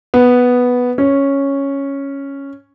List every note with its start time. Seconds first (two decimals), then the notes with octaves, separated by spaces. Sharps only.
0.14 B3
0.98 C#4